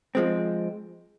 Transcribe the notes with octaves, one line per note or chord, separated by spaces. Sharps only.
F3 G#3 C4